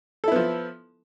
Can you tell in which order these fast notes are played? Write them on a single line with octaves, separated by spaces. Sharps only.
A4 E4 B3 F3